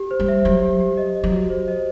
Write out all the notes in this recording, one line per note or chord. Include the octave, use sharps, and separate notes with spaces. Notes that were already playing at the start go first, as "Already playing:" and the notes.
Already playing: G4
C5
G3
E5
F#3 G4
G4
G4
D#5
D#5
F#3
F#4
C5
D#5